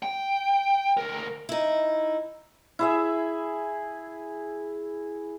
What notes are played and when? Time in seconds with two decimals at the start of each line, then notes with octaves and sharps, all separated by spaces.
0.03 G5
0.97 D2 A#4
1.49 D#4 E4
2.79 E4 G#4 E5